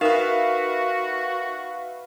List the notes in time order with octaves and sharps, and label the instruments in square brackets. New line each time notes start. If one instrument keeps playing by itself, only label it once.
[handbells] D#4 A#4 [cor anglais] F#4 [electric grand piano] B4 E5 F5